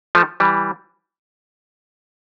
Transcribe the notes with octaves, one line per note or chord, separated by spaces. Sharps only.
F3 A3
E3 G3